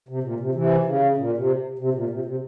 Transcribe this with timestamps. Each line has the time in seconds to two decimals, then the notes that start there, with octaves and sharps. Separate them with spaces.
0.09 C3
0.23 A#2
0.40 C3
0.55 C3 E3
0.86 C#3
1.17 A#2
1.38 C3
1.79 C3
1.94 A#2
2.10 C3
2.25 C3